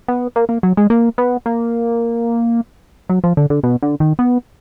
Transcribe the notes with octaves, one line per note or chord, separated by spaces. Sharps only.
B3
A#3
A#3
F#3
G#3
A#3
B3
A#3
F#3
F3
D3
D3
B2
D3
D#3
B3